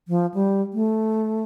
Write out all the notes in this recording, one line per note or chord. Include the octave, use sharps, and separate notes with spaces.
F3
G3
A3